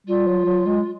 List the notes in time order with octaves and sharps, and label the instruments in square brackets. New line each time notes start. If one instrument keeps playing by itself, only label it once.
[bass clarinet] G3 [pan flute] F4
[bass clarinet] F#3
F#3
G#3